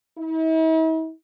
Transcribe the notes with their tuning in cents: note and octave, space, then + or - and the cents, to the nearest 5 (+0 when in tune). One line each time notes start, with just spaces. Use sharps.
E4 -45